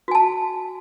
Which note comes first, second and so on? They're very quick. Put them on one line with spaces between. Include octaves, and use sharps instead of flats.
F#4 G#5 A5